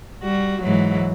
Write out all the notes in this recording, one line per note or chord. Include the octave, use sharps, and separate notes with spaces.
G3 F#4
G#2 E3 F#3